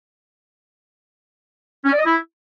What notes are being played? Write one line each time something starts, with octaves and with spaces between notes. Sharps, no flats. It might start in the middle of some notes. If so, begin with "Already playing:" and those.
C#4
D5
D#5
E4